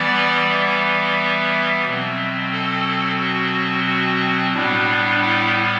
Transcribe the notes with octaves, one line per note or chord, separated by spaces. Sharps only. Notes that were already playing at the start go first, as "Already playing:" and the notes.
Already playing: E3 G3 B3 D5
E5
B2 F#3 C4
A4
F#4
F#4
A2 G3 B3 D4
E4